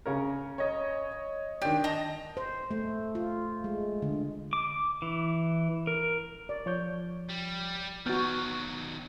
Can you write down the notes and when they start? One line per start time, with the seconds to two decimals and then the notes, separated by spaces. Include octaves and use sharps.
0.06 C#3 C#4 A#4
0.58 C#5 D#5
1.62 D#3 D4 G4
1.84 D#5 A5 A#5
2.37 C5
2.71 A3
3.15 F4
3.64 G#3
4.02 D3
4.53 D6
5.02 E3
5.87 A#4
6.49 D5
6.66 F3 C#5 G6
7.29 G3
8.06 D#3 F#3 B3 F#4 F6 G6 A6